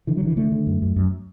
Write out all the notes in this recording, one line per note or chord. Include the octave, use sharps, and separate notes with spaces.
D3 E3
F#3
D3 E3
D3 A3
D3
F#2
F#2
F#2